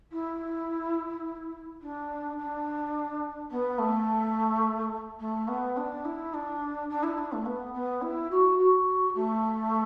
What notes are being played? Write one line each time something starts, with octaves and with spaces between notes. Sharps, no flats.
E4
D4
D4
B3
A3
A3
B3
D4
E4
D4
D4
E4
D4
A3
B3
B3
E4
F#4
F#4
A3